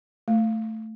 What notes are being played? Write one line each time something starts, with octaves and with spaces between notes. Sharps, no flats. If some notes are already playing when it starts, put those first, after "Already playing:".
A3